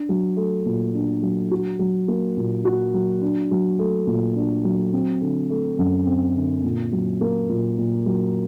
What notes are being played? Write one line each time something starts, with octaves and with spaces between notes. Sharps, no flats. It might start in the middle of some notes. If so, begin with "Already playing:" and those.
Already playing: D4
F#3
A3
A#2
D4
F#3
F#4
F#3
A#3
A#2
F#4
F#3
D4
F#3
A3
A#2
D4
F#3
C4
D3
A3
F#2
C4
D3
A#2
F#3
A#3
A#2
A#2
F#3